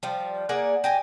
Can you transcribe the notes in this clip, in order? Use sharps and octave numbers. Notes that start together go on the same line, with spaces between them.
F3 G3
A#3 G#4 D5 F#5
G4 D#5 G#5